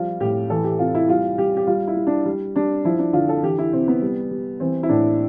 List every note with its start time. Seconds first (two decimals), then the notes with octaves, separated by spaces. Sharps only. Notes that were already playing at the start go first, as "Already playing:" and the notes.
Already playing: F3 G3 F4
0.20 A2 G4
0.50 E3 A4
0.64 G4
0.79 C3 F4
0.95 E4
1.08 G3 F4
1.38 G3 G4
1.57 G4
1.67 G3 F4
1.87 E4
1.96 G3
2.07 D4
2.25 G3
2.56 G3 D4
2.85 F3 E4
2.99 D4
3.13 D3 F4
3.29 A4
3.43 E3 G4
3.58 E4
3.72 C3 C4
3.88 B3
4.02 G3
4.31 G3
4.60 E3 C4
4.83 E4
4.89 A2 D4